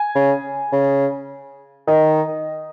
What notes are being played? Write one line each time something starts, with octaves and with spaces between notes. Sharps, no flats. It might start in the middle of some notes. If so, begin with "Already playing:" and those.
Already playing: G#5
C#3
C#3
D#3 D#5